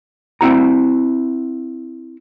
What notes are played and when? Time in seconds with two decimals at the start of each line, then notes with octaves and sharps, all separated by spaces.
0.41 C4 E4 F#4 A#5